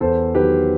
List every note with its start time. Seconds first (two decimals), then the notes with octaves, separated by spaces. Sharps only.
0.01 E2 A4 C5
0.34 D#3 F#3 G4 B4